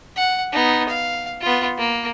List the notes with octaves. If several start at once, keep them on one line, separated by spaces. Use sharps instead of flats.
F#5
B3 D#4
F5
B3 F4
A#3